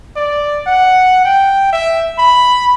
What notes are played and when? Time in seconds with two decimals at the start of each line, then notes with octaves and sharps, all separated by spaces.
0.16 D5
0.67 F#5
1.25 G5
1.73 E5
2.18 B5